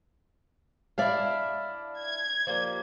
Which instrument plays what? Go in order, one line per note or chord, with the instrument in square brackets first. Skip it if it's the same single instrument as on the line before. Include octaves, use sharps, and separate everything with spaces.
[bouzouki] D4 E4 [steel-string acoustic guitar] D5 E5 F5
[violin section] G#6
[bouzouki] F3 G3 A#3